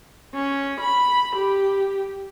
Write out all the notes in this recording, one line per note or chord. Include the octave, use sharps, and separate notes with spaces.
C#4
B5
G4